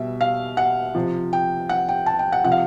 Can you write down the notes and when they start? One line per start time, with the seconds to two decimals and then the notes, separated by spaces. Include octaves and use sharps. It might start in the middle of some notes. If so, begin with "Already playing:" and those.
Already playing: B2 G3 E5
0.21 F5
0.57 F#5
0.95 C3 F3
1.33 G5
1.69 F#5
1.89 G5
2.06 A5
2.19 G5
2.32 F#5
2.44 C3 F3 F#5
2.52 F5